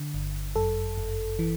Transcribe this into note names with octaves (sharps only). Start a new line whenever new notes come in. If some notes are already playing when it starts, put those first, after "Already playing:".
Already playing: D3
G1
F#2 A4
G1
E3